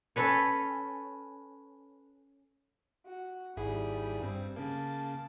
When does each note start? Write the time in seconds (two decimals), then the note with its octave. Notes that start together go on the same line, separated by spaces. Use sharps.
0.16 C#4 A4 B4 C#5
3.06 F#4
3.57 G#1 G3 E4 G#4
4.21 G2 C4
4.56 C#3 A#3 A5